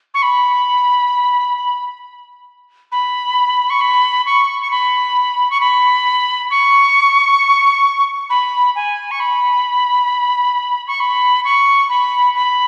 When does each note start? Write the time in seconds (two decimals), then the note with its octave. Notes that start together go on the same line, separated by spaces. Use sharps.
0.14 C#6
0.22 B5
2.92 B5
3.70 C#6
3.81 B5
4.26 C#6
4.62 C#6
4.71 B5
5.50 C#6
5.60 B5
6.51 C#6
8.30 B5
8.76 G#5
9.11 C#6
9.20 B5
10.87 C#6
11.00 B5
11.45 C#6
11.89 B5
12.35 B5